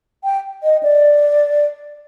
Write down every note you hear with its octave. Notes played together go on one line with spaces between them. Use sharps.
G5
D#5
D5